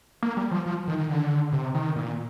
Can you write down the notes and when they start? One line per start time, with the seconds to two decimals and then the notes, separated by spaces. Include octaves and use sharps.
0.23 A#3
0.37 G3
0.51 F3
0.66 F3
0.88 D#3
0.98 D#3
1.09 D3
1.53 C3
1.74 D#3
1.96 A#2